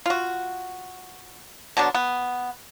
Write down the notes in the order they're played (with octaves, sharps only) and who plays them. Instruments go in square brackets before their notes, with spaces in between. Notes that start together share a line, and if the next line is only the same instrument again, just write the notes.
[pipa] F4 F#4
B2 D3 F#3 D4
B3